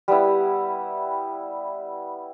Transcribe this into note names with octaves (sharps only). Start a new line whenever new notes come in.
G3 B3 E4